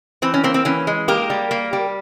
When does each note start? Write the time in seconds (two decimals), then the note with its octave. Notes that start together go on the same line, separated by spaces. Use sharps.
0.22 E3 C4
0.34 C#4
0.44 A#3 C4
0.54 C4
0.65 E3 C#4
0.87 G#3
1.08 A#3 G4 A#4
1.30 G3
1.51 A#3
1.73 G3